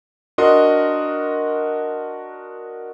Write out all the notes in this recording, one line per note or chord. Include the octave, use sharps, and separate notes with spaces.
D4 F#4 A#4 D#5 C6